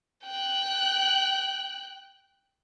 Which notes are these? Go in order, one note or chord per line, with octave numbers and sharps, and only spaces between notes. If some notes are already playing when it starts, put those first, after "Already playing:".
G5 F#6